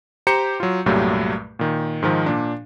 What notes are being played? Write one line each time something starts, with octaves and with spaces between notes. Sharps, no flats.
G4 C5 A#5 G6 C#7 E7
F#3 F4
C2 G2 A#2 F#3 G3 A3
A#2 D#3
G#2 D#3 F3
A#2 D4